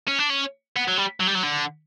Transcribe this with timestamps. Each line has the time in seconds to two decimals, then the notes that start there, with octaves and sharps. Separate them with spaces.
0.08 C#4
0.19 D4
0.30 C#4
0.76 B3
0.88 F#3
0.98 G3
1.20 F#3
1.28 G3
1.35 F#3
1.43 D3